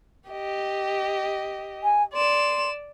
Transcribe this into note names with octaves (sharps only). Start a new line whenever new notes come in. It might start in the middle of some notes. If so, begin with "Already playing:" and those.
G4 D#5
G#5
D5 C6 E7